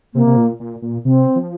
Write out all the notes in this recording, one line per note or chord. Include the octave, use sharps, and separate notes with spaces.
C3 A#3
C3
A#2
A#2
A#2
C3 C4
F3